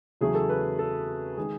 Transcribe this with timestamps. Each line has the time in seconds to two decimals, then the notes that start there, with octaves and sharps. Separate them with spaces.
0.21 E2 C#3 F#3 A3 G#4
0.35 A4
0.49 B4
0.79 A4
1.37 D#3 G#3 G#4